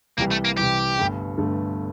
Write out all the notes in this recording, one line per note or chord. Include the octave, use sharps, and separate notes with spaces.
C2 C3 E3 G3 A#3
A3
A#3
C2 C3 E3 G3 G4
G1 G2 D3 A3
G1 G2 D3 A3